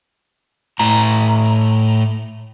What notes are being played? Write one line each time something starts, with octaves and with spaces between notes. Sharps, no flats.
A2 A#5